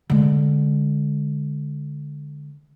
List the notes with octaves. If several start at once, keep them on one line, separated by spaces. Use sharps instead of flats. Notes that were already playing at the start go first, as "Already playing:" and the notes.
D3 G#3